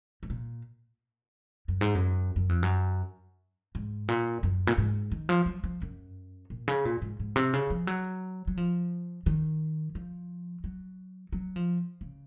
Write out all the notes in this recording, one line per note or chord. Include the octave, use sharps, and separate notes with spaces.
G#2
A#2
F#2
G#2
F#2
F#2
F2
F#2
G#2
A#2
F#2
A#2
G#2
D#3
F3
F#3
F3
F#2
A#2
C#3
A#2
G#2
G#2
C3
C#3
F3
F#3
F#3
F3
D#3
F3
F#3
F#3
F3
C#3